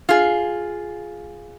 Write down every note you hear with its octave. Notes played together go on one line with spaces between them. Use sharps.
F4 G#4